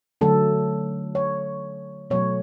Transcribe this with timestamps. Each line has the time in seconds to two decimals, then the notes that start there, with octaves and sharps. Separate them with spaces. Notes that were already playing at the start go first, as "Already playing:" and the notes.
0.21 D3 F#3 A3 A4
1.15 C#5
2.10 B2 F#3 A3 C#5